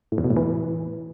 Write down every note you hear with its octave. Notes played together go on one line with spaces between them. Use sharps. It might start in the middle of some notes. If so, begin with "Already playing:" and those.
A2
E2
B2
A2
E3